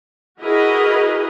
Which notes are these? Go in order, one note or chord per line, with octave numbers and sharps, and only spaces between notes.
E4 F#4 G#4 A#4 B4 D#5